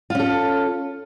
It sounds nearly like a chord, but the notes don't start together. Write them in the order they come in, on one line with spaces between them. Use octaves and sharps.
F4 C#4 A4